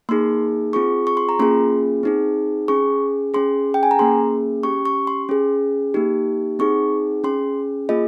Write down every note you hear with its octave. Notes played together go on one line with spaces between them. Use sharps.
A#3 D#4 G#4 C6
C4 F4 G#4 C#6
C#6
C6
A#5
A#3 C#4 F4 G#4 C6
C4 D#4 G#4
C#4 G#4 C#6
C#4 G#4 C6
G5
G#5
A#5
A#3 C#4 G#4 C6
C#4 G4 C#6
C#6
C6
C#4 G#4
A#3 D#4 G4
C4 D#4 G#4 C#6
C#4 G#4 C6
A#3 F4 G#4 D#5